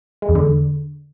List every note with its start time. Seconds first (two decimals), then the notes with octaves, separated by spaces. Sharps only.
0.22 G#3
0.29 E2
0.35 D3